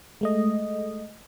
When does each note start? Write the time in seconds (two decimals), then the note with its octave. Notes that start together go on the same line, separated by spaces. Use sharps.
0.21 G#3 A3 D#5